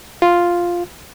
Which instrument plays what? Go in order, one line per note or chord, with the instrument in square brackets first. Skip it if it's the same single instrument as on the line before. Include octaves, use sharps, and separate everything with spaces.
[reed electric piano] F4